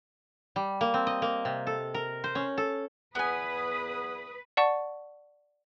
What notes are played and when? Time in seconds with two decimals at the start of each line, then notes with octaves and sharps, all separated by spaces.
0.56 G3
0.81 A#3
0.94 C4
1.07 D#5
1.22 A#3
1.45 C3
1.67 A4
1.94 A#4
2.24 C5
2.35 C#4
2.58 A4
3.15 E2 B3 G#4 B4 G#5 D#6
4.57 D5 F#5 A5 C#6